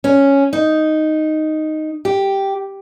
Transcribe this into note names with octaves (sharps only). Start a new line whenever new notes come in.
C#4
D#4
G4